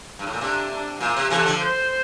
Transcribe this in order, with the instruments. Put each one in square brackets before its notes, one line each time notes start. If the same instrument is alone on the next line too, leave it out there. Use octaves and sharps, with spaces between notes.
[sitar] G2
A2
A#2
[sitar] C3 [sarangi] D4
[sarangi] D4
[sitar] A#2 [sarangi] F4
[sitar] C3
[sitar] C3 E3 [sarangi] A4
[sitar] D3 F3
[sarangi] C5